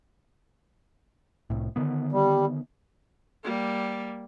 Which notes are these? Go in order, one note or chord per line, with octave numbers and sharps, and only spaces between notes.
C2 A2
D3 D#3 B3
G3
G3 A#3